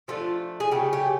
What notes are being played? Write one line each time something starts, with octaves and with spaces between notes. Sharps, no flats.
F3 A3 D4 F4
G#4
C#3 F#3 A3 G4
G4